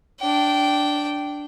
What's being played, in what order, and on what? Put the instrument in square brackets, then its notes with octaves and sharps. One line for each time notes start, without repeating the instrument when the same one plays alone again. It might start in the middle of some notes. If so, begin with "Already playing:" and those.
[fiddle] D4 G5